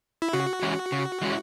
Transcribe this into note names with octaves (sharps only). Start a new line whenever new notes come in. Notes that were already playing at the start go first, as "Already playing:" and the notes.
E4
C#3 F#4
E3 G#3 C#4 E4
C#3
E3 G#3 C#4 E4